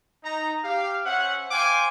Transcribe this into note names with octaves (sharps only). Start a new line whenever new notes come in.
D#4 A#5
G4 F5
C#4 C5 E5 F#5
C5 F5 G5 G#5 C6 D6